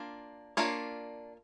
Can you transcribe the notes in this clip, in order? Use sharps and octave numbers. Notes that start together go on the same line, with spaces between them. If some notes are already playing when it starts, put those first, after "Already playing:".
Already playing: A#3 D4 F4
A#3 D4 F4 C#5